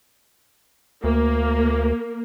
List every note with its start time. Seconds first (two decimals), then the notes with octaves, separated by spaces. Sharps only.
1.04 D2 A#3